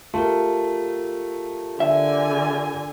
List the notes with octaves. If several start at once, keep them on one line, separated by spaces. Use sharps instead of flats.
A3 F4 G4 A#4
D3 E5 G#5